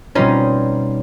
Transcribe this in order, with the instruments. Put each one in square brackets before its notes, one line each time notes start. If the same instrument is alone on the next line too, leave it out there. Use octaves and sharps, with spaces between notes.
[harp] B2 G3 C4 F4 [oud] C#4 D#4